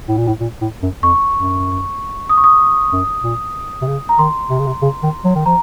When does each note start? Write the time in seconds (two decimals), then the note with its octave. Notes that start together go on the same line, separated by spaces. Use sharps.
0.08 A2
0.17 A#2
0.27 A2
0.40 A#2
0.61 A2
0.83 F#2
1.03 F2 C#6
1.34 F#2
2.29 D#6
2.38 C#6
2.44 D#6
2.92 F#2
3.24 A#2
3.82 C3
3.87 C#3
4.09 A#5
4.18 D#3 C6
4.50 C3
4.59 C#3
4.66 C3
4.82 C#3
5.03 D#3
5.25 F#3
5.35 D#3
5.46 F3 A#5